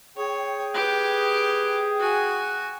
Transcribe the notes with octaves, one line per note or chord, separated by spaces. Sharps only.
G#4 C#5 G5
G4 B4
F#4 G#5